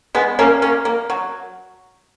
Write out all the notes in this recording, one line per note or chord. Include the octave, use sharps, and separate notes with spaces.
G#3 B3
A#3 C#4
A#3 C#4
A#3
F#3